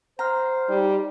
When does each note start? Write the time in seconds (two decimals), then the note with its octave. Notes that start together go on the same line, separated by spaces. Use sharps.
0.19 C5 F#5 A#5 F6
0.69 G3 D#4